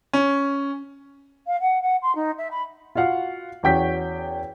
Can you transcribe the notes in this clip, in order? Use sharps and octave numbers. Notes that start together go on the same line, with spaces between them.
C#4
F5
F#5
F#5
C6
D#4
E5
B5
F4 F#4 F5 F#5
E2 C#4 F#4 G5 G6 B6